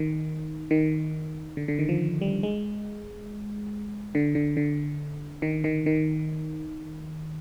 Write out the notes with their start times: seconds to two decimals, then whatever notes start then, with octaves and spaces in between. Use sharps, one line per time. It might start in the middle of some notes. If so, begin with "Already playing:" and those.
Already playing: D#3
0.71 D#3
1.57 D3
1.68 D3
1.79 D#3
1.89 F3
2.21 G3
2.43 G#3
4.15 D3
4.35 D3
4.57 D3
5.42 D#3
5.64 D#3
5.86 D#3